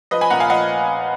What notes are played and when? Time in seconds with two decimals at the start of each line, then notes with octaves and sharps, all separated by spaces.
0.11 F3 B4 D#5
0.21 G#5 B5
0.30 A#2 F#5 A#5
0.40 F5 G#5
0.49 F3 D#5 F#5